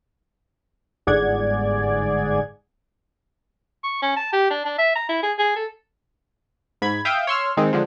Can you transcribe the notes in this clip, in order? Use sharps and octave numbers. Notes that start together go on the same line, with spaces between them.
G1 G#2 G#4 D5 F#5 G#6
C#6
C#4
A5
G4
D4
D4
E5
A#5
E4
G#4
G#4
A4
G#2 B5 G#6
E5 F5 G5 D#6 G6 D7
C#5 C6 E6 F6
D#3 G#3 C4 D#4
D3 F3 G#3